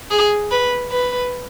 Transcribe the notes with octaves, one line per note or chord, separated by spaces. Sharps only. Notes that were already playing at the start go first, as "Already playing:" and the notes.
G#4
B4
B4